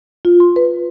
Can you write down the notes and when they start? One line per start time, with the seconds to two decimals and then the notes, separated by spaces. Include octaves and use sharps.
0.25 F4
0.40 C6
0.56 B4